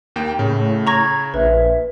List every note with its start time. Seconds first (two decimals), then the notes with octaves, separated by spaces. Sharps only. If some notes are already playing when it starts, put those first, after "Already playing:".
0.16 D#2 A#3 G5
0.39 A2 C#3
0.87 A#5 C#6 G#6 A#6
1.34 A#1 B4 E5